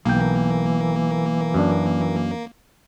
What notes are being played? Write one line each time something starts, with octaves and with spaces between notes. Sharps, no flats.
B1 E3 A#3 G5
F#2 D4